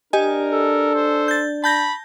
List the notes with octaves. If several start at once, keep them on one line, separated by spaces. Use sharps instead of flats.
D4 G4 A#4 D#5 G#5
A4
C5
G6 A6
A5 B5 G6 A#6